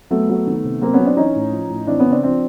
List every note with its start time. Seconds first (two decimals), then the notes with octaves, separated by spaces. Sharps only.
0.11 F#3 A3 B3
0.29 F#3
0.47 D#3
0.64 C3
0.82 F#3 A#3 C4
0.94 B3 C#4
0.99 F#3
1.05 C4 D4
1.17 E3 C#4 D#4
1.35 A2
1.52 F3
1.70 A2
1.87 E3 C4 D4
1.99 B3 C#4
2.05 C#3
2.11 C4 D4
2.23 F3 C4 D4